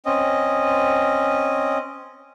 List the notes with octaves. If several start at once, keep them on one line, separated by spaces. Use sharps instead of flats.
C4 C#4 D#5